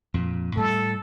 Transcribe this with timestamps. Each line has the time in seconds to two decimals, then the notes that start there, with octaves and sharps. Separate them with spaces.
0.14 F2 A#2
0.57 A2 G3 A4